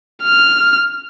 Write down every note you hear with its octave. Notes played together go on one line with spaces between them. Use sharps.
F6